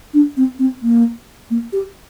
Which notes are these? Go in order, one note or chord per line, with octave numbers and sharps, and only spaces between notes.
D4
C4
C4
A#3
A#3
G4